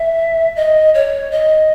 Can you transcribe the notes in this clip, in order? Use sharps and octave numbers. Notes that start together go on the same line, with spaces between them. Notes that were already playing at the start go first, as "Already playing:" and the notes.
Already playing: E5
D#5
C#5
D#5